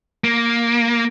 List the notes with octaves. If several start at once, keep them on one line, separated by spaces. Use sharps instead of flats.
A#3